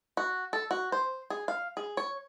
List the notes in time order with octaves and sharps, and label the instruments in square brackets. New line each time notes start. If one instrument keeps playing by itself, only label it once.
[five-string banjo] F#4
A4
F#4
C5
G#4
F5
G#4
C#5